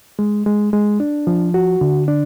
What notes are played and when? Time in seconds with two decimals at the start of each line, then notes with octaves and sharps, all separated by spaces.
0.19 G#3
0.46 G#3
0.73 G#3
1.00 D4
1.27 F3
1.54 F#4
1.81 D3
2.08 D4